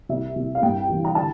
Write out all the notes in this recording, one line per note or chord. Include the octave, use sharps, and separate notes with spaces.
C2 E5
C2
F5
G2 G5
E3
A#5
D3 A5